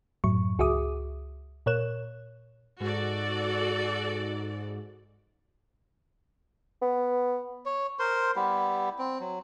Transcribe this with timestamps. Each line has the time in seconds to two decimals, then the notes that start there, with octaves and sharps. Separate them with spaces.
0.24 F#2 A2 F#3 C#6
0.59 C#2 F#4 G#4 E5 D6 D#6
1.66 A#2 A#4 C#5 F#6 E7
2.80 G#2 F#4 A4 D5
6.81 B3
7.66 C#5
7.99 A#4 C5 C6
8.36 G3 B3 E4 G4
8.98 C4
9.20 F#3